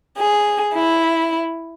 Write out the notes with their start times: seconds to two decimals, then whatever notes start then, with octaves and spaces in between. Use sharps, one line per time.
0.18 G#4
0.73 E4